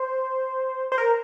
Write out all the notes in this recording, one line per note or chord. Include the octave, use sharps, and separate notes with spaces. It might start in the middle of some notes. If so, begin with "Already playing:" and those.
Already playing: C5
C5
A#4